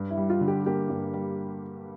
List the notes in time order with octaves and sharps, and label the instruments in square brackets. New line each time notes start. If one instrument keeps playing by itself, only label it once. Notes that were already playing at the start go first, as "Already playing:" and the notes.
Already playing: [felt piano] G2
[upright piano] E4
[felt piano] G3
[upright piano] F4
[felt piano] D3
[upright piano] G4
[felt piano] A#3 [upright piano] G4
[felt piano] G2
G3